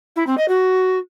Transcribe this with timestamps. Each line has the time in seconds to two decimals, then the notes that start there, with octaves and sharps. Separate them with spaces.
0.16 E4
0.27 C4
0.37 D#5
0.48 F#4